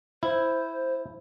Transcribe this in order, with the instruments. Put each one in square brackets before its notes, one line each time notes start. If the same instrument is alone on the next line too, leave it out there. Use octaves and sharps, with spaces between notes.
[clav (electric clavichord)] E4 [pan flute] C5